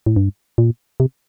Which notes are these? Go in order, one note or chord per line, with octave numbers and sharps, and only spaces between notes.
A2
G2
A#2
C3